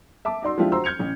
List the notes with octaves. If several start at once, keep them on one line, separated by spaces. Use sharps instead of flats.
E5 A5 D6
D#4 F#4 D5 C6 E6
F3 G#3 D4 E4 F4 G4
F#4 C5 A#5 C6 E6
F6 G6 G#6 C#7 F7
A1 C#4